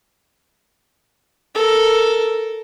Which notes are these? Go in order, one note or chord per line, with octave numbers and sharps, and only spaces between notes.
A4 A#4